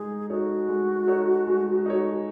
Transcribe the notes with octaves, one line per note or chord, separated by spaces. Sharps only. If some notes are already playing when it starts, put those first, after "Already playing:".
Already playing: G#3 D#4 G#4
D#4 F#4 A4 C#5
G#3
D#4 A4 C#5
G#3
D#4 A4 C#5